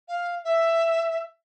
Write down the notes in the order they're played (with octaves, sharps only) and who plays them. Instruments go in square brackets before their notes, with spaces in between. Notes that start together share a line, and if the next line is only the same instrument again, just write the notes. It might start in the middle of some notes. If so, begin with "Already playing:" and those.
[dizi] F5
E5